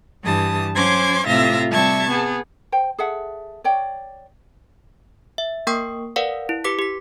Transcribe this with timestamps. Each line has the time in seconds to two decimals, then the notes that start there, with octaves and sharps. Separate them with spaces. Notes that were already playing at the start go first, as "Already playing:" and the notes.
0.22 G2 E3 G4 A5 D#6
0.75 F#3 C#4 C5 C6 D6 G#6
1.27 A2 C3 F4 E5 F5 A#6
1.69 C3 G3 E5 A5 C#6 G#6
2.09 B3 G#4
2.72 C5 G5
2.99 G#4 A4 E5 F#5
3.64 C#5 D5 G5
5.38 E5
5.67 A#3 A#4 G5 C#6 D#6 C7
6.16 A#4 B4 D5 F5 F#5
6.49 E4
6.64 G4 B4 D6 B6
6.79 G4 B6